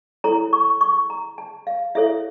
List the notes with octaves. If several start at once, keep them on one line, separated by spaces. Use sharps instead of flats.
E4 A4 C#5 A#5
C#6
C#6
A#5
A5
F5
E4 A4 C#5 E5